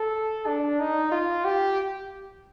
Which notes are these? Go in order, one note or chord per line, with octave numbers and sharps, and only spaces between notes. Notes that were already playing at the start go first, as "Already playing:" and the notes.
Already playing: A4
D4
D#4
F4
G4